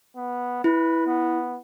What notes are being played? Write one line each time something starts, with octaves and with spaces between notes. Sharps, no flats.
B3
E4 B4
B3